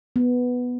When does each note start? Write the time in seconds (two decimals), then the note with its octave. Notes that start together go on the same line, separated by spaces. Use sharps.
0.16 B3